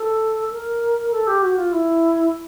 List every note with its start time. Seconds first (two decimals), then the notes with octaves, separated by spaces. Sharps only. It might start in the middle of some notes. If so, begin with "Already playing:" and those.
Already playing: A4
0.51 A#4
1.11 A4
1.27 G4
1.42 F#4
1.58 F4
1.72 E4